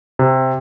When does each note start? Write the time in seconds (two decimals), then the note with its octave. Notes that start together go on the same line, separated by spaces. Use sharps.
0.19 C3